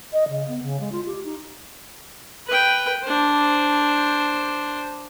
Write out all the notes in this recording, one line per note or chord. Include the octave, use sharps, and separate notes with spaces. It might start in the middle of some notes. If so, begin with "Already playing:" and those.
D#5
C#3
B3
C#3
G#3
F4
G4
D#4
B4 G5
D4 C5